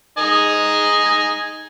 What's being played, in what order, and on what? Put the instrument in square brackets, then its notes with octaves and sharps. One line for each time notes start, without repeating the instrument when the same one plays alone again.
[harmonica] D#4 D#5 G#5